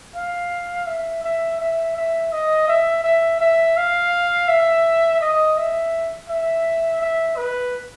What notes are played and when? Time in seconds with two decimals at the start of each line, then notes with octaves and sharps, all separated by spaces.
0.16 F5
0.87 E5
1.24 E5
1.60 E5
1.97 E5
2.32 D#5
2.68 E5
3.04 E5
3.41 E5
3.77 F5
4.48 E5
5.21 D#5
5.58 E5
6.29 E5
7.01 E5
7.37 B4